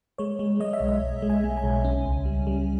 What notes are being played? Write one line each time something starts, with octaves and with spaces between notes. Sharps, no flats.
G#3 C#5
G#3
G#3 D#5
E5
B1
D#5
B1
G#3
G#5
G#3
G#5
B1
C#4
C#2
G3
G3